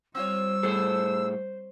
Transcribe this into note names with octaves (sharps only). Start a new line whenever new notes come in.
G3 C4 F4 C#5 E6
A2 G#4 A4 C5